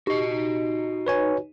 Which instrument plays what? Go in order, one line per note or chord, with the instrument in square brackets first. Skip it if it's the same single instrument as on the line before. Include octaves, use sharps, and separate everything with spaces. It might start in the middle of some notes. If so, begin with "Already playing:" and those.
[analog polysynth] D#4 [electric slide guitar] F#4 D#5 [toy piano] G4
[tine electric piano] B4 C#5 G#5